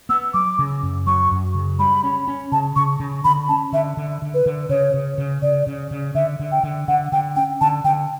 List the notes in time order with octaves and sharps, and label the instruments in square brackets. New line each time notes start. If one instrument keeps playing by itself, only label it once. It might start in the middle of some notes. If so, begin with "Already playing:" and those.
[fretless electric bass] B3 [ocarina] E6
[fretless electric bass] F#3 [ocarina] D6
[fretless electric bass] C#3
F#2
[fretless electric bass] F#3 [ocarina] C#6
[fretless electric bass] F#2
C#3
[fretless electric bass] G3 [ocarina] B5
[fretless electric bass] C#4
C#4
[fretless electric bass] C#3 [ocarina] A5
[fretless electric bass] C#3 [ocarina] C#6
[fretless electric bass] C#3
[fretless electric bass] D3 [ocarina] B5
[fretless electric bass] C#4 [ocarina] A5
[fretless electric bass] D3 [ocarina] E5
[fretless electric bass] D3
D3
[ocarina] B4
[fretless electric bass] D3
[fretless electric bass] C#3 [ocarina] C#5
[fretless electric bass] C#3
C#3
[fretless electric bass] C#3 [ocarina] D5
[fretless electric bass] C#3
C#3
[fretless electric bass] D3 [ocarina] E5
[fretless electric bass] D3
[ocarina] G5
[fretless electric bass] D3
[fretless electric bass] D3 [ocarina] F#5
[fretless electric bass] D3 [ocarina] G5
[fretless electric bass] C#4 [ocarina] G5
[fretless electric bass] D3 [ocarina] A5
[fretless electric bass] D3 [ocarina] G5